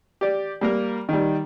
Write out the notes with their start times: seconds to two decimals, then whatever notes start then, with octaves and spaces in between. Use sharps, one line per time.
0.21 G4 D5
0.61 G3 A#3 A#4
1.09 D#3 G3